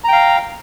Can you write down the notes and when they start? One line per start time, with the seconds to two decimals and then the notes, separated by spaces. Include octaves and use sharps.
0.04 A#5
0.08 G5
0.12 F5